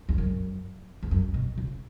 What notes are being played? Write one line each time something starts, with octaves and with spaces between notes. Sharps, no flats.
E2
F#2
E2
F#2
B2
C#3